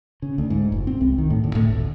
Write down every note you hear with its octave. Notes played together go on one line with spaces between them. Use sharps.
C#3
D2
G#2
F1
C4
C2
D#3
A2
D2
A2
G1
D2